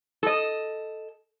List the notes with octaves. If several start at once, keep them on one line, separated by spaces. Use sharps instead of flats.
A4 D#5